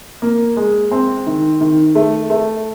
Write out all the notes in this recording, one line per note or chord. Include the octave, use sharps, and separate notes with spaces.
A#3
G#3
C4
D#3
D#3
A3
A3